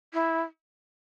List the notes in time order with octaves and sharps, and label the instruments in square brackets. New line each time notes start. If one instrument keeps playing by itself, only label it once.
[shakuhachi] E4